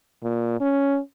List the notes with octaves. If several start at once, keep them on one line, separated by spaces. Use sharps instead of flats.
A#2
C#4